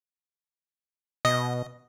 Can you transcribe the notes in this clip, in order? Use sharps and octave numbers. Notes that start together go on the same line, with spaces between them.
B2 D#5